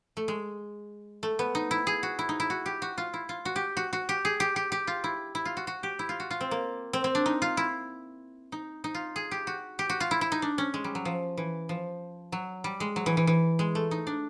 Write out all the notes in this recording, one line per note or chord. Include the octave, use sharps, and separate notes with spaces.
A3
G#3
A3
B3
D#4
E4
G#4
F#4
E4
D#4
E4
F#4
G4
F#4
F4
E4
F4
F#4
G4
F#4
F#4
G4
G#4
G4
G4
G4
F4
E4
E4
F4
F#4
F#4
G4
E4
F4
F#4
F4
C4
A#3
C4
C4
D4
D#4
F4
E4
D#4
D#4
F4
G#4
G4
F#4
G4
F#4
F4
E4
E4
D#4
D4
C#4
G#3
G3
F#3
F3
E3
F3
F#3
G3
G#3
F#3
E3
E3
E3
G#3
A3
D#4
D4